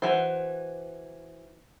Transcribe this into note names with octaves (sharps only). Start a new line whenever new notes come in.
E3 F#4 C5